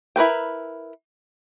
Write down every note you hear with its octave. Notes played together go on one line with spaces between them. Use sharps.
E4 A#4 B4 G5